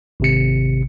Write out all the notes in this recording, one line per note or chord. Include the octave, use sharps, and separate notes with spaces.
G#1 C3 C#7